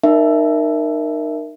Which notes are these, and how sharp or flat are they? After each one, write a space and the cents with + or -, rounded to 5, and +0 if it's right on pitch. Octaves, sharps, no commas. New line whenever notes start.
D#4 -30 A#4 +0 E5 +10